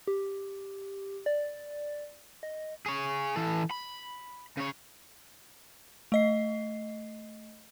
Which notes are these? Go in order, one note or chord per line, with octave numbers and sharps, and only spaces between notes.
G4
D5
D#5
G#4 C#5
E3 A4
B5
C#3 C#5
A3 D#5 C7